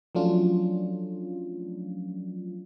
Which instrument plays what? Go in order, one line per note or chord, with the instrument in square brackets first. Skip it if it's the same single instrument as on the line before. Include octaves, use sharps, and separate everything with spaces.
[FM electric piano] F3 F#3 A3 C#4 D4 F4